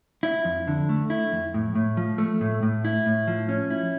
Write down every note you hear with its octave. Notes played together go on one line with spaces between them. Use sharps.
E4
F2
D3
A3
E4
F2
A2
A2
F3
A3
A2
A2
E4
A2
F3
C#4
E4